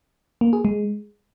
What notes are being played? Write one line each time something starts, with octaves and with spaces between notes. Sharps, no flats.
A#3
G#4
G#3